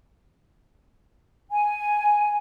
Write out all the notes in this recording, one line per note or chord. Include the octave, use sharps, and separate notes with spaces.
G#5